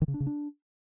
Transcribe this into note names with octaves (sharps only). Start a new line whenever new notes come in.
D#3
C#3
D4
C#3
D4